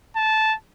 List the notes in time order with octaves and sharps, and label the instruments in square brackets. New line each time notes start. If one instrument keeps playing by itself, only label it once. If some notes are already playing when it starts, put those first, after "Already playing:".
[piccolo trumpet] A5